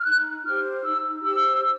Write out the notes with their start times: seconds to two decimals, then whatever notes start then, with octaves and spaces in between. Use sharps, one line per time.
0.01 F6
0.06 D#4 F#6
0.45 G4 C5 F6
0.85 D#4 E6
1.23 G4 C5 E6